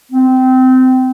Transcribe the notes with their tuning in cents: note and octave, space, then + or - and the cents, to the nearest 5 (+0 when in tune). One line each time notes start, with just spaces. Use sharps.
C4 -20